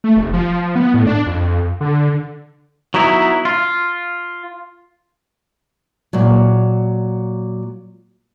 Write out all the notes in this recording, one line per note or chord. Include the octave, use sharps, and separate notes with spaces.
A3
F1
F3
B3
A2
D4
F2
D3
F#3 B3 D#4 E4
F4
A#2 F#3